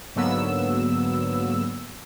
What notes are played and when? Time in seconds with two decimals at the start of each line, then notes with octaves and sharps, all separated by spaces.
0.15 G#2 D3 F#3 A#3 B3 E6